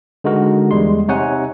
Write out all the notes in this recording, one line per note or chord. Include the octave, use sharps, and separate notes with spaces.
D3 G#3 D#4 F#4 A#4
E2 G3 G#3 C6
C3 D#4 C#5 F#5 G#5